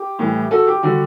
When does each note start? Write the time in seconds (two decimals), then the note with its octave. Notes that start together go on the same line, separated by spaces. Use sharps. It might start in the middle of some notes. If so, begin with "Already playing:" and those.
Already playing: G4
0.19 A2 E3 G3
0.51 F#4 A4
0.67 G4
0.82 D3 G3 F#4